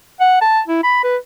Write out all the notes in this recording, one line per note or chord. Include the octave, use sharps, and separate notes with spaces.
F#5
A5
E4
B5
B4